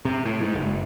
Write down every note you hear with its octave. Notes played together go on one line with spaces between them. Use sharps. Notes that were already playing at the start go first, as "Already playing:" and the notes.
C3
A2
G#2
F#1